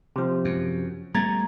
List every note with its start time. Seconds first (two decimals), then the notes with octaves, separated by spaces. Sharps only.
0.16 C3 F3
0.45 F#2
1.15 G3 A3 B3 A#5 G#6 A6